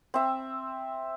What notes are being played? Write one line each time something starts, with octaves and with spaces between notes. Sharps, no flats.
C4 E5